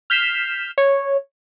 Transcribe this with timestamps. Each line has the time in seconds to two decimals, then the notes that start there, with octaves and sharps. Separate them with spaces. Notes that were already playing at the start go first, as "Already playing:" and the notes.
0.10 F6 G6 B6 C7 E7
0.78 C#5